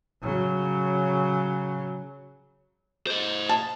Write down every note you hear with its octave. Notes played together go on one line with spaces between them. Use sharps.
C#3 F#3
C5 D#5
A5